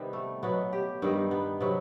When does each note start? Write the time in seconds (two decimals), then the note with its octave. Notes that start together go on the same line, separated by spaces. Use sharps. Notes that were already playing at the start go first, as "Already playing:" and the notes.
Already playing: C3 D#3 G3 B3
0.13 A3
0.43 B2 F#3 B3
0.73 G4
1.02 G2 D#3 G3 D#4
1.31 B3
1.60 C3 F#3 B3